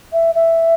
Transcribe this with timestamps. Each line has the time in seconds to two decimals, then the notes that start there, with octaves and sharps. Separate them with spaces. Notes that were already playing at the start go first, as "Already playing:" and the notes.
0.13 E5
0.35 E5